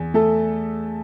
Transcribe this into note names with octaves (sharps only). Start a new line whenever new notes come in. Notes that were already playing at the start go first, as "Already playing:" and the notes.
Already playing: E2
A3 A4